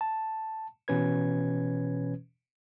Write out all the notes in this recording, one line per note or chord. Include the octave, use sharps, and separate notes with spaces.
A5
B2 E3 C#4 B4 G#6